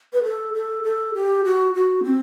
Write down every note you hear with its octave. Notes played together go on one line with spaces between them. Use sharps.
B4
A4
A4
A4
G4
F#4
F#4
C4